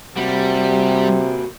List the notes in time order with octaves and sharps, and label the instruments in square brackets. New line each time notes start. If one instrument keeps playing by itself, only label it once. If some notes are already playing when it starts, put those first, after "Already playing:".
[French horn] C3 [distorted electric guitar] G3 [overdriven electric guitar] A#3 F#4